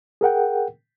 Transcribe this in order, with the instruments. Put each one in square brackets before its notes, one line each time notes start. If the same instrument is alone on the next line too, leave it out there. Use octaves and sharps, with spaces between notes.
[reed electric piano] G#4 A#4 F#5 G5